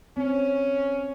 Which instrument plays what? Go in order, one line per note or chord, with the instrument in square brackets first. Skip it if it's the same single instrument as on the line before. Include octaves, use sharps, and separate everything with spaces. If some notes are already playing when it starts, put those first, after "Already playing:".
[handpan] C4 [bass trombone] C#4